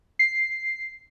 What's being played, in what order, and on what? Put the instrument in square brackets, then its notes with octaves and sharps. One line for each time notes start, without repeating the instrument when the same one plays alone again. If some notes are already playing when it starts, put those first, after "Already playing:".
[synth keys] C7